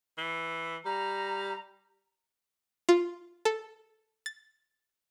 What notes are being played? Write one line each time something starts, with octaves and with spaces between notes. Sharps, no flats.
E3
G3 A#5
F4
A4
A6